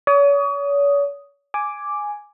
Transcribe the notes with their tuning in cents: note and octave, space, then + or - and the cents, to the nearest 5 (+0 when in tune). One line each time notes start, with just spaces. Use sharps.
C#5 +40 D#6 +0
G#5 +0 D6 +0